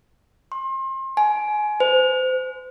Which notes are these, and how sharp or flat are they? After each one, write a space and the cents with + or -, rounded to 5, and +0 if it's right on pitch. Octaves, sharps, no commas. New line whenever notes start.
C6 +35
G#5 +20
C5 -30